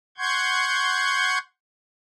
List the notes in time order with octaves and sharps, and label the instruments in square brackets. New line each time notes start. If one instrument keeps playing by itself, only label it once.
[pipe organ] F#5 C6 C#6 G6 G#6